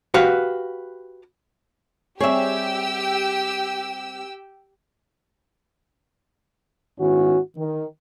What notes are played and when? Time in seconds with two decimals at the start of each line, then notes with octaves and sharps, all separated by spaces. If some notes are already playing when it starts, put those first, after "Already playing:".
0.14 F#4 G4 B4 F5
2.20 G3 C4 G4 G#4 C#5 E5 G5 E6
7.00 G#2 D#3 B3 C#4 E4 F#4
7.57 D#3